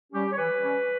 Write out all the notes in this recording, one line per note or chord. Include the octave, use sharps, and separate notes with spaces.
G3 C#4 G4
C#5
E3 B4
G3 C#4